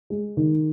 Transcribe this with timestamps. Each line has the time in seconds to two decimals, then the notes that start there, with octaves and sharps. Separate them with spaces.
0.10 G#3
0.37 D#3